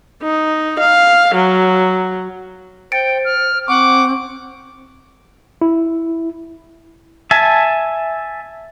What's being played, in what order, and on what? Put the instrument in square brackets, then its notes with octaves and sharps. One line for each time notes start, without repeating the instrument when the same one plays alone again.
[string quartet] D#4
F5
F#3
[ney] C5 [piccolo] G5 [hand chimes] A6 C#7 D7
[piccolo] F6
[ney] C4 [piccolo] F#5 [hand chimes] C#6 [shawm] D6
[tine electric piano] E4
[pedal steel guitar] E5 G#5 A5